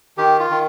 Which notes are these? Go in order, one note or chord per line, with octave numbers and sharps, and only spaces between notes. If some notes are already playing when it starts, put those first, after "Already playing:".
D#3 G4
F4
D#3